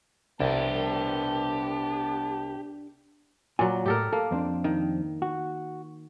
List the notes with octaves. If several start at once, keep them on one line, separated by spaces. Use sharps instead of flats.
C2 B3 D4 G4 A#4 A5
A#2 F#3 G#5
A2 G4 A4 A#4
A#3 A4
F2 C4 D4
D#3
F#4